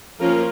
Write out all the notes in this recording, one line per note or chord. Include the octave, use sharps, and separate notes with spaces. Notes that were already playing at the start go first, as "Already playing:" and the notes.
F3 A#3 C#4 F4 A#4